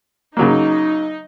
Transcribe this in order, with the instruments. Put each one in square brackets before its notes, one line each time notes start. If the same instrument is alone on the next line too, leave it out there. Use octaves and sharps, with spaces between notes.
[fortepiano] C#3 F#3 A#3 [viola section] D#4